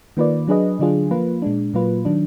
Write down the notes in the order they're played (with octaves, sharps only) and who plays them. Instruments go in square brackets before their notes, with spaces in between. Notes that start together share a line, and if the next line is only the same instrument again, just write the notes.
[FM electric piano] D#3 A#3 F4 B4 D5
F#3 D4 G#4 B4 D#5
D3 F#3 D4 F4 G#4
F3 A#3 F4 B4
A#2 G#3 D4
A#2 F#3 A#3 F4 B4
D#3 F#3 D4